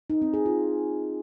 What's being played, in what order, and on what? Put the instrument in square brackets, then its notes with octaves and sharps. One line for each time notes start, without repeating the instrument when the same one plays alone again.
[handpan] D#4
C4
G#4
F4